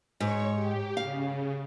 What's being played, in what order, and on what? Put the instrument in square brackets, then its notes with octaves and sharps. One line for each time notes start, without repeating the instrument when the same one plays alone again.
[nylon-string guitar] G#2 [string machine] C#5 C#6
[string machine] G4
[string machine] C#3 [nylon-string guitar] F5